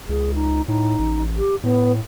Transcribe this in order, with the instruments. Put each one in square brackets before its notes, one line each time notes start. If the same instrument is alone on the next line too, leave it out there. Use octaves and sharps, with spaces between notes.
[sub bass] C#2 [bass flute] G#4
[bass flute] D#4
[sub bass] A2 [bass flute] D#4
[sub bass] A1
[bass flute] G4
[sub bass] A2 [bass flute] B3